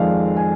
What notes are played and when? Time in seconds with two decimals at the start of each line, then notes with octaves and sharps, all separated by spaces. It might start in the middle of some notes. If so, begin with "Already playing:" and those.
Already playing: F2 D#3 G#3 D5 F5
0.37 G#5